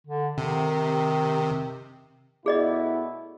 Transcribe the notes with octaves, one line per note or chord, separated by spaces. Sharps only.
D3
C3 D#3
B2 A3 E4 G#4 D5 D#5